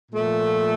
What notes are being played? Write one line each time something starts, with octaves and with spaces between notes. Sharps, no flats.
A#2 F3 A3